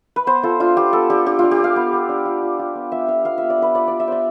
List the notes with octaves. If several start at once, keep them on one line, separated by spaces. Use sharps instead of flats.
B4
B3 C5
F4 A4
D4 F4
B3 G4
B3 A4
D4 G4
D4 G4
D4 F4
G4
D4 F5
B3
B3
D4
F4
F4
F4
B3
B3 E5
F4 F5
B3 F5
B3 E5
D5
B3 B4
F4 D5
F4 D5
E5
B3 C5 D5